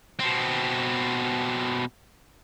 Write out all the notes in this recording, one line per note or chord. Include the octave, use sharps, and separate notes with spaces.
B2 C4